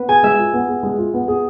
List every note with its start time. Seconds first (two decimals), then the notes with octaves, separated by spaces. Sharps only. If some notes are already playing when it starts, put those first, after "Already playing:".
Already playing: B3 B4
0.08 G#4 G#5
0.23 G#3 E5
0.39 F4
0.53 B3
0.68 G#4
0.83 G#3
0.98 F4
1.14 B3
1.28 G#4